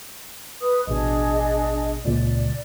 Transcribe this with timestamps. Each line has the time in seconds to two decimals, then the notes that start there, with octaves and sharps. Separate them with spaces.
0.61 B4 D#6
0.88 A1 B2 D4 G#4 D#5
2.05 C#2 A#2 C#3 D5